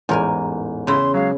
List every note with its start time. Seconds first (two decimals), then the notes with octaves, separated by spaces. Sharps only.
0.09 A1 E2 G#2 A#4 G#5
0.87 C#3 E4 C6
1.14 F#3 G#3 F5